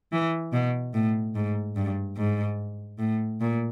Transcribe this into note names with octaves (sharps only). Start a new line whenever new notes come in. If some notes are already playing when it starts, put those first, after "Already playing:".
E3
B2
A2
G#2
G2
G#2
A2
A#2